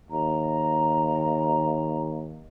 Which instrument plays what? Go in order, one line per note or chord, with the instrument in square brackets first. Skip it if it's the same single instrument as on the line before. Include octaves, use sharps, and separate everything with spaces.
[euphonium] D#2 [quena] A#5